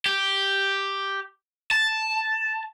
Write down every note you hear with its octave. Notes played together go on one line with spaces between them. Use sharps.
G4
A5